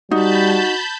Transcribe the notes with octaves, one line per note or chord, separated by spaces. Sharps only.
G3 D#4 F#4 A5 B5 G6